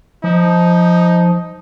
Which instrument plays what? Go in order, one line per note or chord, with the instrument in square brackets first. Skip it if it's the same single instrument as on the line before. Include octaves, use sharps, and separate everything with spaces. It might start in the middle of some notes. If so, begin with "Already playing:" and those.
[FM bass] F3 [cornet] D#4